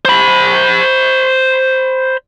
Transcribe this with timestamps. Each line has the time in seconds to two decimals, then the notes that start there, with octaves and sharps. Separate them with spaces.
0.05 C5 B5